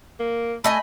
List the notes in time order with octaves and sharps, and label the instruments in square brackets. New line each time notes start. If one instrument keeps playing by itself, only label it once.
[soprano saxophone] A#3
[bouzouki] A3 D#5 G#5 [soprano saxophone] B5